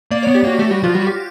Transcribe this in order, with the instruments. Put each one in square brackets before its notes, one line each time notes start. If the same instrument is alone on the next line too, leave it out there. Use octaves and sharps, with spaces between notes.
[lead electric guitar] A#3 [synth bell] D5
[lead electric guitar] B3 [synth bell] C#5
[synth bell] G4
[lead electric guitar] A#3 [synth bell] F#4
[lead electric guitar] A3 [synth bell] G4
[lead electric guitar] G3 [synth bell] F#4
[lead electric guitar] F3 [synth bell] F4
[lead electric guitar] G3 [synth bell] F#4
[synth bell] G4